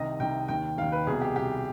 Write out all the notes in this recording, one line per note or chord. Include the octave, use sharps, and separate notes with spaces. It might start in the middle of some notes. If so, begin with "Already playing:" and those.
Already playing: C2 C3 D#3 D#5
C2 C3 D#3 G5
D#2 D#3 G5
D#2 D#3 F5
B4
C2 B2 G#4
G4
C2 B2 G4